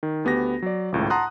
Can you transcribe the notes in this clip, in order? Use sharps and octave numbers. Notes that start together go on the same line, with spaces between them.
D#3
D2 B3 G4 A#6
F#3 D5
G#1 C#2 A2
F#5 A5 A#5 C6 D#6 F#6